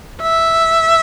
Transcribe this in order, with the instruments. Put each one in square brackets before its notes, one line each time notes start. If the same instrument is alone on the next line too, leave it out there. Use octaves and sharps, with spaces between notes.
[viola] E5